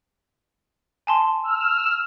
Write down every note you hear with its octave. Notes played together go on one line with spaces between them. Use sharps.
G#5 A5 C6
E6 F6